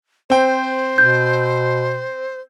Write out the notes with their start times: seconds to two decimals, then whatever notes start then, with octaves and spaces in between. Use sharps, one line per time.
0.30 C4 C5 G5
0.98 B2 G6